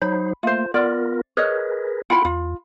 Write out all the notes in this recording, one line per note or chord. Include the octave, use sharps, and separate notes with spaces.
F#3 D#4 C5 B5
A3 A#3 F4 C5
B3 F4 A#4 D5
G#4 A#4 B4 C#5 D#5
E4 F4 F#5 G5 B5
E2 F4